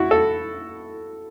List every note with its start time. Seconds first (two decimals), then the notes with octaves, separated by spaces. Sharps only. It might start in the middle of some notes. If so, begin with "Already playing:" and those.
Already playing: E4 F#4
0.11 A4